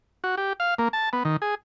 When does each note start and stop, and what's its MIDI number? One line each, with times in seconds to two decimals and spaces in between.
0.24 0.35 66
0.37 0.53 67
0.60 0.74 77
0.78 0.88 58
0.93 1.09 81
1.13 1.23 59
1.25 1.37 51
1.42 1.55 68